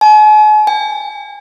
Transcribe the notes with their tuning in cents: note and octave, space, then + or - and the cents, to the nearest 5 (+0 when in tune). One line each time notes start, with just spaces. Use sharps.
G#5 +45
G#5 -40